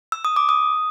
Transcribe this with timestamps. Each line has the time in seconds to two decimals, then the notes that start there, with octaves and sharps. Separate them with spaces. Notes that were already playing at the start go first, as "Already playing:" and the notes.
0.12 E6
0.25 D#6
0.36 D6
0.49 D#6